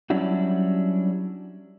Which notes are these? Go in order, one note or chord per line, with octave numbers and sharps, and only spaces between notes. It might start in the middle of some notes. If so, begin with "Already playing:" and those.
F#3 G3 C#4 D4 E4 F#4